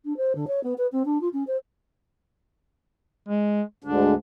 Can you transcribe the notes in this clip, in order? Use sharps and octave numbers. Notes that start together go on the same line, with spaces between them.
D4
C5
D3
C#5
B3
B4
C4
D4
F4
C#4
C5
G#3
D2 G#2 D3 D4